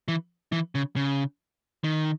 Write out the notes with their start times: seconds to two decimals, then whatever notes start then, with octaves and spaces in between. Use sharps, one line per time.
0.08 E3
0.52 E3
0.75 C#3
0.96 C#3
1.84 D#3